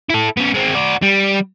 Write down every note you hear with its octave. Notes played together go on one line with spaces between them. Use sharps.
E4 A4
B3 C#4
G#3 C4
F#4 D5
G3